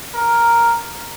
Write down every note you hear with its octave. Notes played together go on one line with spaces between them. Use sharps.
A#4